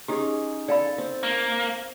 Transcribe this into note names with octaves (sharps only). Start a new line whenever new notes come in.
C#4 D#4 G4 G#4 C#6
A4 D5 F5 B5
C4
A#3